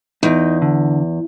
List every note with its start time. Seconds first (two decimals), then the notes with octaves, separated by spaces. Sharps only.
0.23 E2 D#4
0.62 D3